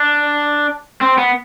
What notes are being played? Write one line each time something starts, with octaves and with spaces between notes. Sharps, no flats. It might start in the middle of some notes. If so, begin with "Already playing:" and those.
Already playing: D4
C4
B3